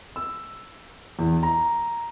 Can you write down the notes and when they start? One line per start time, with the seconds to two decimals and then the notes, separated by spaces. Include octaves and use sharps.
0.16 E6
1.19 E2
1.43 A#5